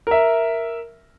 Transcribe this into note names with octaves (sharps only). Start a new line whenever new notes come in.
A#4 E5